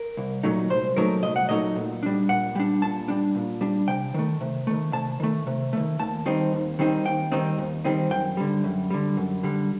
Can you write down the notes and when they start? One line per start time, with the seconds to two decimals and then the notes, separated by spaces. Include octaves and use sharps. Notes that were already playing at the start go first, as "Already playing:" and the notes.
Already playing: A#4
0.17 C2
0.43 A#2 F#3 A3 D#4
0.70 C2 C5
0.97 A#2 F#3 A3 D#4 A#4
1.23 C2 D#5
1.36 F#5
1.49 A#2 F#3 A3 D#4 D#5
1.76 A#2
2.03 G3 D4
2.29 A#2 F#5
2.55 G3 D4
2.82 A#2 A5
3.08 G3 D4
3.35 A#2
3.61 G3 D4
3.88 C3 G5
4.14 D#3 A3
4.41 C3
4.67 D#3 A3
4.93 C3 A5
5.20 D#3 A3
5.47 C3
5.73 D#3 A3
5.99 D#2 A5
6.26 D#3 G3 C4 D#4
6.53 D#2
6.79 D#3 G3 C4 D#4
7.05 D#2 G5
7.32 D#3 G3 C4 D#4
7.58 D#2
7.85 D#3 G3 C4 D#4
8.11 F#2 G5
8.37 D3 G3
8.64 F#2
8.90 D3 G3
9.17 F#2
9.43 D3 G3